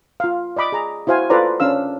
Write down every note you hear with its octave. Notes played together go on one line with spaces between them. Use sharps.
F4 F5
D5 D#5 B5 D6
G#4 A#5
E4 F#4 C5 F5 G#5
F4 A4 B4 C5 D5 A#5
C#4 D4 F5 E6